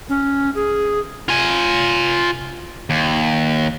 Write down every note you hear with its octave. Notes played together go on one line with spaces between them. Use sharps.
C#4
G#4
F4 G#5
D#2